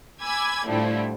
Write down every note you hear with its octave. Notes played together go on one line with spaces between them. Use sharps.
G#5 B5 D6 E6 G#6
A2 D3 F3 G3 A3 E4